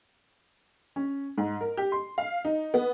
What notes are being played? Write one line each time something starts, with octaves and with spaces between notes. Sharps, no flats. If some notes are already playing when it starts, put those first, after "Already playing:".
C#4
G#2
A#4
G4
C6
F5
D#4
B3